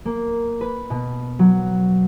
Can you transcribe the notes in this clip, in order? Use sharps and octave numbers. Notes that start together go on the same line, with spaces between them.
A#3
B4
B2
F#3